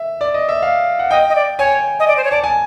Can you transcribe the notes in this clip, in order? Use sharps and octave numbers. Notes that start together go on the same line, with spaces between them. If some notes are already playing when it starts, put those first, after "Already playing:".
Already playing: E5
D5
D#5
E5
F5
F#5
D#5 G5
D#5
D5
C#5 G#5
D#5
D5
C5
C#5
D5 A5
G#5